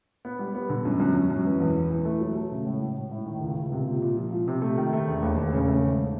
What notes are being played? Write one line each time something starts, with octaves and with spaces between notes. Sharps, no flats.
B3
G3
B3
D3
F#2
F#2
F#2
F#2
E3
E2
E3
E3
A3
F#3
A3
C#3
A2
A2
A2
A2
D#3
C#2
C#2
C3
A#2
A#2
F3
A#2
C3
A3
D#3
A3
E1
D#2
E1
C#3
A3
G#2